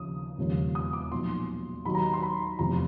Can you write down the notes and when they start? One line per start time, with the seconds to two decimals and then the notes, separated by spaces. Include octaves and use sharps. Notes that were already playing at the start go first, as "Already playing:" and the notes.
Already playing: D#2 C#3 F3 D#6
0.38 E1 D#2 C#3 F3
0.75 D#6
0.93 D6
1.12 B1 A#2 F3 C6
1.85 D#2 D#3 F#3 B5
1.95 A#5
2.13 C6
2.23 B5
2.59 F1 E2 C3 F3 A#5